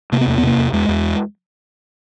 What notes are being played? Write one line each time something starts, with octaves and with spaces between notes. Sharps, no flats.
C3 A#3
B3
E2 A#3
B3
C3 A#3
E2
E2 G#3
E2